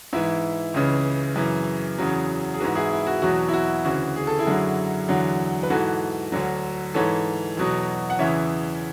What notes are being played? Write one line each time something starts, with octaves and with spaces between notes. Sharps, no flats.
G#2 E3 E4
C#2 C#3 E3
F#2 C#3 E3
E2 C#3 F#3
G#4
G#2 E3 F#4
E4 G#4
E4
F#4
E2 B2 F#3 F#4
E4
F#4
D2 C#3 E3 F#4
G#4
A4
E4 G#4
F#2 D3 F#3
E2 D3 F#3
B4
G#2 E3 F#4 A4
D2 D3 F#3
G#2 E3 A4 C#5
E2 B2 F#3
F#5
E2 C#3 E3 C#5 E5